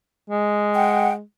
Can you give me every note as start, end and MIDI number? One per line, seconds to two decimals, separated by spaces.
0.30 1.21 56
0.74 1.12 78
0.74 1.12 79